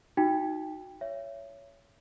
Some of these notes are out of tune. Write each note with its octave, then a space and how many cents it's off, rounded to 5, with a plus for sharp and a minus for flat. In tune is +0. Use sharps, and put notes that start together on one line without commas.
D#4 +0 F#4 -15 G5 +15
C#5 +15 E5 +30